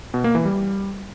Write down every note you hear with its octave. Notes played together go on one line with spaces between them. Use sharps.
B2
A#3
E3
G3